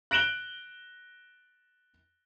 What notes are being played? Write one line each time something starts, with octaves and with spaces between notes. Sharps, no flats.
F#6 A#6 D7 E7 F#7 G7